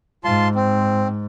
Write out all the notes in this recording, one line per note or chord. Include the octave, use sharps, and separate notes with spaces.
G#2 F4 A5 C6
C4